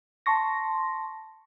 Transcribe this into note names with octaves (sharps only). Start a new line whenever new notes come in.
A5 C6 C#6 A#6